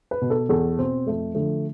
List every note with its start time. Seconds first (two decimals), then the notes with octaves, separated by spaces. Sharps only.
0.11 B4
0.22 B2
0.30 A4
0.49 E2 A4
0.78 B2 C4
1.06 F2 A3
1.35 D3 F3 A3